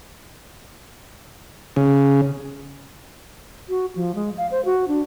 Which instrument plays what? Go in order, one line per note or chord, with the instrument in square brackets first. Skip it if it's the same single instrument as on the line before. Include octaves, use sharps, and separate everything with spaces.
[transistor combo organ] C#3
[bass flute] F#4
F3
G#3
F5
C5
F#4
D4